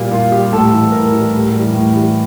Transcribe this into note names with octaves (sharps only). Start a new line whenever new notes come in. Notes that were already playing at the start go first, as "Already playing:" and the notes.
Already playing: A#2 G3
A#2 F4
G3 G4
A2 A4
E3 G3
A2 A#4
E3 G3
A2
E3 G3
A2
E3 G3